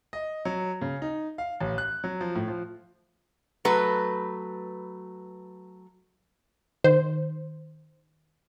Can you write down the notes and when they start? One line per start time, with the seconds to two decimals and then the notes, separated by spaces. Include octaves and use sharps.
0.13 D#5
0.45 F#3
0.81 C#3
1.02 D#4
1.38 F5
1.60 A1
1.78 F#6
2.04 F#3
2.21 F3
2.35 A2
2.48 F3
3.65 F#3 A3 B4
6.84 D#3 C5